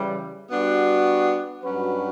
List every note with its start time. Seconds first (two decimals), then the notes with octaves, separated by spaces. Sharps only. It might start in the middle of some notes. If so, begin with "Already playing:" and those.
Already playing: C#3 E3 G3
0.51 G3 B3 D4 F#4
1.62 G2 F#3 C#4 F#4 B4